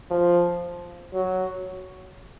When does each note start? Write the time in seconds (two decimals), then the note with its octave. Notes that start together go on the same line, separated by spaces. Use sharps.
0.11 F3
1.14 F#3